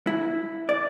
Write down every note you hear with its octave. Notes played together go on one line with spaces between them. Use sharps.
E4
D5